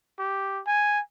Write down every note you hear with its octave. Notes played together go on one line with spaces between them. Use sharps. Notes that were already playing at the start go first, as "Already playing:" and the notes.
G4
G#5